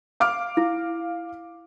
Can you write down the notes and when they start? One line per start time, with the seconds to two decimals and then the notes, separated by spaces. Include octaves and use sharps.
0.20 F5 D6 F6
0.57 E4